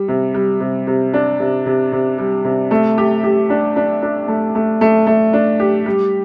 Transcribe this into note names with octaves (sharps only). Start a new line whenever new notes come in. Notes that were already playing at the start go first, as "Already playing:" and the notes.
Already playing: G3
C3
G3
C3
C3
D4
C3
C3
C3
G3
C3
A3
G4
G4
D4
D4
D4
A3
A3
A3
A3
D4
G4
G3